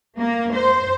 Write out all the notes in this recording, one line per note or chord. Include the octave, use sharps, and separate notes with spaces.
A#3
C5